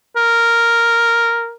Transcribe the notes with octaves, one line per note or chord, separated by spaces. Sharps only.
A#4